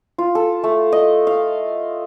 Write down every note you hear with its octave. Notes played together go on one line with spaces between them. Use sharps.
F4
A4
A3
D#5
F5